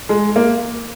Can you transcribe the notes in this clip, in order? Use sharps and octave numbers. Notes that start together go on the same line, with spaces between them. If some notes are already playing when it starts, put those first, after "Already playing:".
G#3
A#3